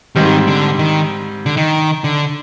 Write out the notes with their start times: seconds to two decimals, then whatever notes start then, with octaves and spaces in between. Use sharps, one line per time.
0.15 G#2 D#3 G3 C4
0.48 D3
0.79 D#3
1.46 D3
1.57 D#3
2.04 D3